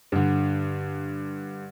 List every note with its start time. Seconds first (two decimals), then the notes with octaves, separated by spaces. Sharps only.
0.12 G2 D3